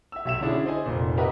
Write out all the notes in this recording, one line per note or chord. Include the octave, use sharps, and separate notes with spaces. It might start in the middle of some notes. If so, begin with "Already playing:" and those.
E5 E6
B1 E5 E7
D3 C#4 D4 E4 G#4
C5 D#5 G#5
F1 A#2
F#4 G4 A#4 B4 D#5 E5